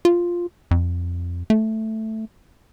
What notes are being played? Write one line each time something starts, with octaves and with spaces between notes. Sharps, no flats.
F4
F2
A3